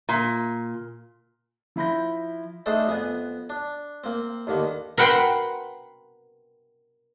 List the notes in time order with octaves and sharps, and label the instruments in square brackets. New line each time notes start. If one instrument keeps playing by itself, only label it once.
[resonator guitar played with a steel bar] A#2
[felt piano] F3 E4 B5 G6 A#6
[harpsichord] A3 D4 D#4 G#4 A4 C5
F2 B3 G#5
D4
A#3 C4
D#2 D3 D#3 A#3
[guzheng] A#4 B4 F#5 G5 B5 C6